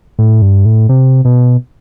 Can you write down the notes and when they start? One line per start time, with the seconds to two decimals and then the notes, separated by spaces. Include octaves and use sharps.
0.19 A2
0.42 G2
0.65 A2
0.89 C3
1.25 B2